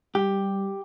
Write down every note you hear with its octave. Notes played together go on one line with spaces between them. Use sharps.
G3 G4